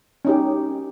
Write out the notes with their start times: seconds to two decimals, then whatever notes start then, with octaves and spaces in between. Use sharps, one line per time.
0.25 C#4 D#4 G4